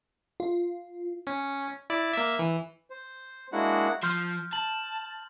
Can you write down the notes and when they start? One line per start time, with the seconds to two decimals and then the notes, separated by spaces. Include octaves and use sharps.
0.40 F4
1.27 C#4
1.90 E4 D5
2.13 A#3 E5
2.39 E3
2.90 C5
3.52 G#3 A#3 D4 E4 F#4 F#5
4.03 F3 C6 F6 G6
4.53 A5 F#7